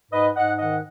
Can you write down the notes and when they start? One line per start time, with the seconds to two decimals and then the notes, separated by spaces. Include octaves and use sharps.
0.12 G#2 B4 D#5
0.35 G#2 D#5 F#5
0.59 D#3 D#5 F#5